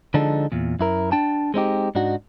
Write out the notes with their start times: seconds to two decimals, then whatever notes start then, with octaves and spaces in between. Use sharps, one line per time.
0.14 D3 F3 G#3 D4 D#4 A4
0.52 E2 A#2
0.79 F#2 E4 A#4
1.12 D4 G5 A5
1.54 G#3 C4 D#4 G4
1.95 G#2 D4 D#4 F#4